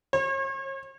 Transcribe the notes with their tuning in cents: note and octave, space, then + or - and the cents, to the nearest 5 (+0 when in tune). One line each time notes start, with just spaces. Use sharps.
C#5 -40